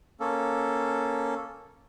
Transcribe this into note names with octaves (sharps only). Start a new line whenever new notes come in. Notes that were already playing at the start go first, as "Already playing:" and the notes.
A#3 C#4 A4